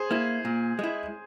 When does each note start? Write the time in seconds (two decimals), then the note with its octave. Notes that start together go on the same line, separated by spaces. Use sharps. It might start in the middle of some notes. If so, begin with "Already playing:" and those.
Already playing: G#4 C5
0.11 A#3 E4
0.45 A#2
0.79 G#3 E4